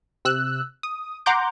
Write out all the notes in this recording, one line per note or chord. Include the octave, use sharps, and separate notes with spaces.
C3 E6 F#6
D#6
F#5 A#5 C6 D6 G6